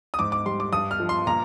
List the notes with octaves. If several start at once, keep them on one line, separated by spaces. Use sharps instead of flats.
D#6
G#2 D6
D6
G3 C6
D6
G2 D#6
F6
F3
C6
A#2 A#5